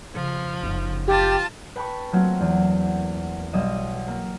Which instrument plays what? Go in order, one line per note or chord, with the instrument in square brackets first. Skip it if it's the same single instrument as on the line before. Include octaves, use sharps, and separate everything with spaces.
[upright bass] F2 C#3 [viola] F3
[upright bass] F#1 D#4
[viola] F4 A5 [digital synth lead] G4
[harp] B4 G5 A5 B5 C#6
F#3 A3 A#3 C4 F4 F#4
E2
B1 G3 D#5 F5 D#7 E7
A#3